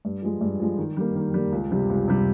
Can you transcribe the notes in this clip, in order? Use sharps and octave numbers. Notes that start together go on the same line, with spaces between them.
G2
F3 G#3
G2
F3 G#3
D#3
G3 A#3
D#3
G3 A#3
C#2
C3 G3
C#2
C3 G3